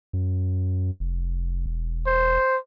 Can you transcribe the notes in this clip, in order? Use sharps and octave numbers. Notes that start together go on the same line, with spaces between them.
F#2
F1
E1
C5